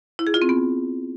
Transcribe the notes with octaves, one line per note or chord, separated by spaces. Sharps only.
E4
G#4
F4
C4
B3